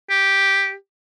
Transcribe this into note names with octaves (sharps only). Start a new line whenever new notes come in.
G4